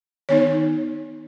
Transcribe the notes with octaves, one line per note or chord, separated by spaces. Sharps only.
D#3 B3 D#4 C#5